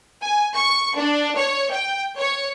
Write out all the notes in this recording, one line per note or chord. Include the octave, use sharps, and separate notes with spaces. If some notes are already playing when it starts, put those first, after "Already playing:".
G#5
C#6
D4
C#5
G5
C#5